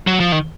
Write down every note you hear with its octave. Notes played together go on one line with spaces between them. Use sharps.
F#3
F3
D#3